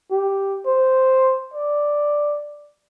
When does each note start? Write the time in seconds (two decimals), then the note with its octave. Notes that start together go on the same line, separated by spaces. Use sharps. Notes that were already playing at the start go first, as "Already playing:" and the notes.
0.11 G4
0.66 C5
1.54 D5